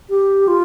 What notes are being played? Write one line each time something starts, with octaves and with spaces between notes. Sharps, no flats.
G4
F4